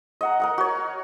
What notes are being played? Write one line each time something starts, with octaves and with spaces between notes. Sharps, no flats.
D#5 F#5 A#5
A#4 D#5 F#5
F#4 C#5